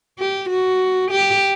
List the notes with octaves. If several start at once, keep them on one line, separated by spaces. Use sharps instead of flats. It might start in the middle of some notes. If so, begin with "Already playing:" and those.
G4
F#4
G4